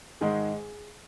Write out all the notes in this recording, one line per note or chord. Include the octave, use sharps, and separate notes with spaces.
G#2 D#3 G#3 G#4